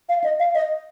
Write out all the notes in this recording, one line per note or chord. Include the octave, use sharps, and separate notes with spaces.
F5
D#5
F5
D#5